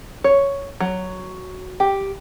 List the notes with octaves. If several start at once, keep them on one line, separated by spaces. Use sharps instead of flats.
C#5
F#3
G4